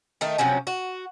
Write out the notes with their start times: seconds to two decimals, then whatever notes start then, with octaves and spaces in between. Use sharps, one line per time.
0.21 D#3 A3 D#4
0.38 C3 F3 F#3 C#4
0.67 F#4